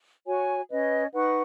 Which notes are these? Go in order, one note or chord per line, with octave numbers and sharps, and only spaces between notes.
F#4 C#5 G#5
C#4 B4 D#5
D#4 B4 F#5 C#6